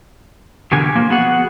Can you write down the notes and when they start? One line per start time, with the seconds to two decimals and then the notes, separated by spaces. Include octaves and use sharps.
0.71 E2 B2 D3 G4 A#4 G#5
0.95 F3 A#3
1.10 B3 F#4 G#4 F#5